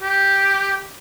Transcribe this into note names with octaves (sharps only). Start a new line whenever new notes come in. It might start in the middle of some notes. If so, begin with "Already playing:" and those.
G4